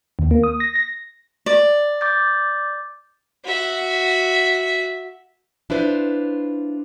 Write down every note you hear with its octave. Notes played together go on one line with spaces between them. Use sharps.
D#2
A#3
D#6
A#6
A#6
D5
D6 G6 A6
F#4 E5
D4 E4 F4 B4 C5